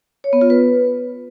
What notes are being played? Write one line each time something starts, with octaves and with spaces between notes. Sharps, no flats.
C#5
B3
F4
B4